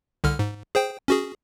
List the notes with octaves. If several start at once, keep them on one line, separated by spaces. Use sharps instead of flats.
C2 D3 F6
G#2
G#4 C5 G5
C#4 F#4 G#4